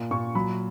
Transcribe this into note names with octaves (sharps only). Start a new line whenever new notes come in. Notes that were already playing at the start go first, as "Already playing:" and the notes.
Already playing: A#2
A#2 C#6
F#3 B5